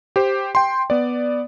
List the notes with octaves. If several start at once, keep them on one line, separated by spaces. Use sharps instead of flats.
G4 C5
G5 C6
B3 D5